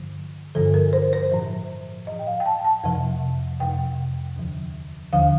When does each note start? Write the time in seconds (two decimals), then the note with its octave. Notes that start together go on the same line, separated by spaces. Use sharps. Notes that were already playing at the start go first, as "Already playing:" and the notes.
Already playing: G2 D3 F3
0.55 G2 D3 F3 A4
0.74 A#4
0.93 C5
1.13 C5
1.32 A2 F3
2.07 A2 F3 D#5
2.19 G5
2.27 F5
2.40 G5
2.46 A5
2.64 A5
2.84 F2 C3 F3
3.60 F2 C3 F3 G5
4.36 D#2 D3 F3
5.13 D#2 D3 F3 F5